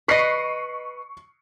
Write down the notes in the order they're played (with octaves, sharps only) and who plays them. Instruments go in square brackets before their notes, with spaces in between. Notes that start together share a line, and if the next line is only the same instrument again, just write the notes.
[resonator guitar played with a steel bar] B4 D#5 [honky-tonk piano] C#6 C7 C#7